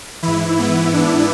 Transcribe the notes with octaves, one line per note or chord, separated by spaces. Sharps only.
G#2 E3 E4
B3
D4